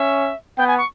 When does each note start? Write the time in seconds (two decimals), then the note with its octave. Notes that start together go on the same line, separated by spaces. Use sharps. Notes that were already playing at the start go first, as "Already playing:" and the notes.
Already playing: C#4 E5
0.57 B3 G5
0.68 G#5
0.78 C#6